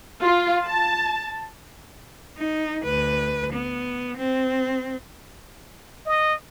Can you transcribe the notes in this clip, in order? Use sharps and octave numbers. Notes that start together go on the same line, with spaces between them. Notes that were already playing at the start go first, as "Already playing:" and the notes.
F4
A5
D#4
D2 B4
B3
C4
D#5